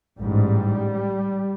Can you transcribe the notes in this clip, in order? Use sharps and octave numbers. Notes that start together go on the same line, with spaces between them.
A1 G#2 G3